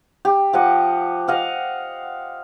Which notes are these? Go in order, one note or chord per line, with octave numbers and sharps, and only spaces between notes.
G4
F3 G4 D#5 F#5
D#5 F5 F#5